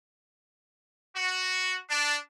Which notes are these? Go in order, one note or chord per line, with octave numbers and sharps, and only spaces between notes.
F#4
D4